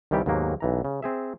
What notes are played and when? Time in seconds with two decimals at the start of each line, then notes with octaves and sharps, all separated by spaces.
0.11 C2 D#3 E3 G3 G4
0.26 D#2 G#2 D#3 F#3 A#3 B3
0.60 B1 E3 A#5
0.85 C#3
1.02 C4 G#4 E5